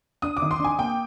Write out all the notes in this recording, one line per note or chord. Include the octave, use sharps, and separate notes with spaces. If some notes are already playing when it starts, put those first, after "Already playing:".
D4 D#6
D6
D#3
C6
D4 G#5
A#3 G5